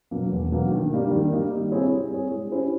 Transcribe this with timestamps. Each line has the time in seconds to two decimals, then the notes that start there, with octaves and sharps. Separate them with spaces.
0.11 B2 F#3 A#3
0.31 E2
0.52 B2 F#3 A#3
0.72 D#3
0.92 G3 A#3 D#4
1.11 D#3
1.32 G3 A#3 D#4
1.51 G3
1.72 C4 E4 G#4 C#5
1.92 G3
2.12 C4 E4 G#4 C#5
2.32 G#3
2.52 C#4 E4 G4 C5